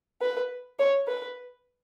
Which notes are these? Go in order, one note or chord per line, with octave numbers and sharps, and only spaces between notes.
B4
C#5
B4